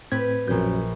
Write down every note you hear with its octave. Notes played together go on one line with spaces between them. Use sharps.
A2 C4 G4 B4 G#6
A#1 F#2 G6